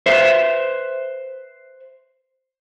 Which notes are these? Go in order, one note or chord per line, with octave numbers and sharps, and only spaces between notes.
B4 C5 E5